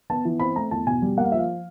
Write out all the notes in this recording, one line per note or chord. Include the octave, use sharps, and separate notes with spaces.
B3 A5
E3
C4 B5
A3 A#5
E2 A5
B2 G#5
G3
A#3 F#5
F5
F3 E5
F5